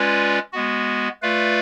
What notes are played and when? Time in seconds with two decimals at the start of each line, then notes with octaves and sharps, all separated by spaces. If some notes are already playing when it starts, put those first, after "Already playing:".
Already playing: G#3 C#4 F4 B4 D5
0.53 G#3 B3 F#4
1.22 A3 F4 B4 D5 F5